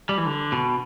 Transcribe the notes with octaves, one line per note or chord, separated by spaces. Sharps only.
G3
E3
D3
B2